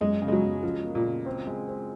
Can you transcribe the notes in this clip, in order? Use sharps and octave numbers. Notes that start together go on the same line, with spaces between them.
F#2 G#3
C#3
G#3
F#3
F#2
C#3 F3
A#3
A#2
C#3
C4
G#3
C4